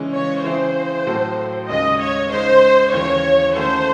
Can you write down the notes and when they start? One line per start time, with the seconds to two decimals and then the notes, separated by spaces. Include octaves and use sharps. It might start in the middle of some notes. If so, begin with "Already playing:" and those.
Already playing: C#3 E3 G#3 C#4
0.13 C#5
0.44 C#3 E3 C4 E4 G#4 C5
1.06 A2 F#3 C4 F#4 A4
1.69 D#2 C#3 G#3 D#5
1.99 C#5
2.31 C#3 G#3 D#4 C5
2.92 D#2 C#3 E3 C#5
3.55 D#3 A3 C#4 F#4 A4 C5